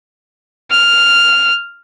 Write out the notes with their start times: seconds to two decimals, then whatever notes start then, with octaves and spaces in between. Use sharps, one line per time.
0.70 F6